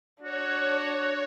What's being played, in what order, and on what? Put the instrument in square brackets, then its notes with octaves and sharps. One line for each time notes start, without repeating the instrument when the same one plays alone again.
[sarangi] D4 [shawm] F#4 [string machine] C#5